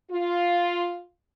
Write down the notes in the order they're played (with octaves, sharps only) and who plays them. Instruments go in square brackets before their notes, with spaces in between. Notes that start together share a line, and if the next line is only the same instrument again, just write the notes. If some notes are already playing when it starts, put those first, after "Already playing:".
[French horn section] F4